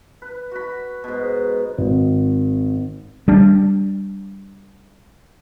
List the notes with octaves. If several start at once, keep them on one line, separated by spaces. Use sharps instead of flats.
B4
F#4 B5
G#2 B2
G#1
G3 D4